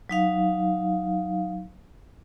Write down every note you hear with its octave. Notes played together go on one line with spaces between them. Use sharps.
F#3 D#4 F5